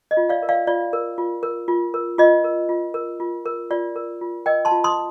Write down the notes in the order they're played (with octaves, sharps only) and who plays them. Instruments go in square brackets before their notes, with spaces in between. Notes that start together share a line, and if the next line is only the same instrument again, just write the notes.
[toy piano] D#5
F4
D5 F5
A#4
D5 F5
F4 D5
A#4
F4
A#4
F4
A#4
F4 D#5
A#4
F4
A#4
F4
A#4
F4 D5
A#4
F4
A#4 D#5 G5
A5 C6
F4
C6 D#6